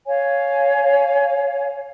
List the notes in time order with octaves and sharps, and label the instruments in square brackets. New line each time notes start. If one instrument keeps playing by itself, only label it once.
[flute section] C#5 F5 G#5